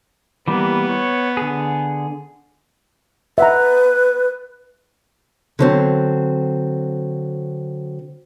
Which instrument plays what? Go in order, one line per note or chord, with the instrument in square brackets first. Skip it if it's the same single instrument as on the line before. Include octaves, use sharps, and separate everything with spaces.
[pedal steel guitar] E3 G3 A#3 [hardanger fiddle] B3
[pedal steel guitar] C#5
D3 G#4
[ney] B4 [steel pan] E5 F#5 A#5
[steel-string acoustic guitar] D3 F#3 C4